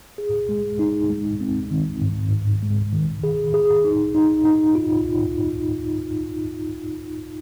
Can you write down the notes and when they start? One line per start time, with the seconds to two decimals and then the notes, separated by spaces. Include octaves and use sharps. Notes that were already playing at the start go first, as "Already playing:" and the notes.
0.18 G#4
0.49 G#3
0.79 D#4
1.10 G#3
1.40 C4
1.71 D#3
2.01 G#2
2.32 G#2
2.62 G#3
2.92 D#3
3.24 G#4
3.54 G#4
3.84 D#4
4.15 D#4
4.45 D#4
4.75 F4